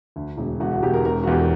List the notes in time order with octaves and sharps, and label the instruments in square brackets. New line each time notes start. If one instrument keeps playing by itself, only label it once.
[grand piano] D2
E1
E1 F#4
F#4
E1 G4
A#4
E1 A#4
F#4
E2 G4
A#4